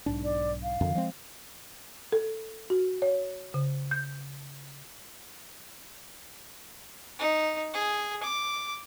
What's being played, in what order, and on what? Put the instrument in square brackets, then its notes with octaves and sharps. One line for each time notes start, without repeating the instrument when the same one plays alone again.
[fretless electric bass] B1 G#2 D4
[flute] D5
F5
[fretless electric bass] F2 D3 D#3
F3 G#3 C4
[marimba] A4
F#4
C#5
C#3
G6
[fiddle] D#4
G#4
D6